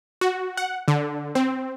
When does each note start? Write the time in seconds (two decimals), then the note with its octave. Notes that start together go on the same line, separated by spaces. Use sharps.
0.21 F#4
0.57 F#5
0.88 D3
1.35 C4